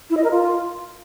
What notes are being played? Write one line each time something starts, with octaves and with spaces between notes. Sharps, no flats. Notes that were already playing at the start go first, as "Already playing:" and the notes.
E4
D#5
A#4
F4